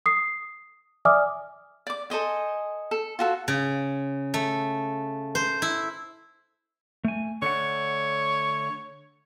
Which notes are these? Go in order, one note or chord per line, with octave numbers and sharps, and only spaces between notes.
D#6 C7
D5 E5 G#5 D6 D#6 F6
D5 D6
A4 C5 D#5 G#5
A4
F4 F#4 A4
C#3
A3
C5
E4
A3 G#5
D3 A3 C#5 F#5